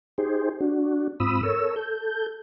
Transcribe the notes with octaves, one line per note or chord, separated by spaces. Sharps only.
D#4 G4 G#4 C5
D4 F#4
G#2 C4 F4 B5 D#6 E6
A4 A#4 C#5 E6
A4 G6